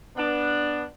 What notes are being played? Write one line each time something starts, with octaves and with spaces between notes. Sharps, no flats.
B3 D4